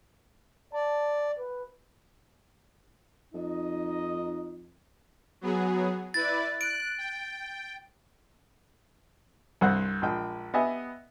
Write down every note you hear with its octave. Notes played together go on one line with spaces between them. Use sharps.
D5 A5
B4
F2 D#4 D#5
F#3 B3 G#4
E4 B4 D5 A6
F#6 D7
G5
C2 G2 C5 F#5
A#1 G#3 G5
B3 G4 D#5 E5 G#5